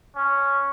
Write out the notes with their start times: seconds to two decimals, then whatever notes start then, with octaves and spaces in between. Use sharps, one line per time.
0.16 C#4